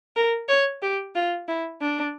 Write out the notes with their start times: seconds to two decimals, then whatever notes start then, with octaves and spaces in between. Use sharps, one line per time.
0.16 A#4
0.49 C#5
0.82 G4
1.15 F4
1.48 E4
1.81 D4